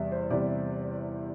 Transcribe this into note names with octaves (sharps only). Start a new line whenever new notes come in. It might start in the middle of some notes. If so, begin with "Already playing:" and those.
Already playing: E2 C3 G3 D5 E5
C5
E2 C3 G3 D5